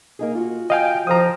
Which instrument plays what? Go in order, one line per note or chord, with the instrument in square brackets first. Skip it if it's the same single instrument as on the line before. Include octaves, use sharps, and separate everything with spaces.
[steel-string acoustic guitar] A#3 D#4 G#4
F4 F#4
[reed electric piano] D#5 F5 G#5 [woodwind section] G5
[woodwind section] C2 F2 F5 [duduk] F3 [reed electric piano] A#5 D#6